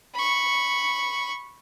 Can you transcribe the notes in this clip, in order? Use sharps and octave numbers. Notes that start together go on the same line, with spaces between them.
B5 C#6